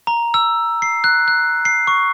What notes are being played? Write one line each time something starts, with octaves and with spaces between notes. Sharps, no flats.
A#5
E6
C7
F#6
F#6
C7
C#6